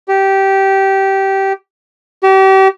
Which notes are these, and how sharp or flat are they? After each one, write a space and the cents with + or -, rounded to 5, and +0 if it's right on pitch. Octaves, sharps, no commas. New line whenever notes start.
G4 -15
G4 -35